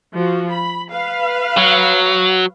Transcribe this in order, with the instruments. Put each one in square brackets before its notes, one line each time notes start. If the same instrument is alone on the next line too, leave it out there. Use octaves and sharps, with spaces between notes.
[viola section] F3 F#4
B5
B4 F5
[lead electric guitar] F#3